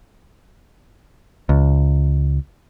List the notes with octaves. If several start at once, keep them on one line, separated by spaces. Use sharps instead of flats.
C#2